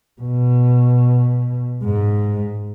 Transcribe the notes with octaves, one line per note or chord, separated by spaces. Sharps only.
B2
G#2